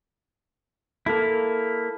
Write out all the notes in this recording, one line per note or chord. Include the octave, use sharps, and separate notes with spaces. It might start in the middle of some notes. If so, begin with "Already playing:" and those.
A#3 E4 A4